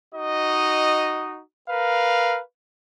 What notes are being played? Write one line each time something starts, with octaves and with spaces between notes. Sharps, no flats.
D#4 F#4 D#5
A#4 B4 F5